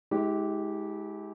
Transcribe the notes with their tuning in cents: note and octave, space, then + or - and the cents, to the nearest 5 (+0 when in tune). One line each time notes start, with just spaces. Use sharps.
G#3 +20 E4 -45 G4 -10